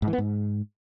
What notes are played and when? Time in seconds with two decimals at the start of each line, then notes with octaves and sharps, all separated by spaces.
0.02 G#2
0.08 E3
0.13 B3
0.18 G#2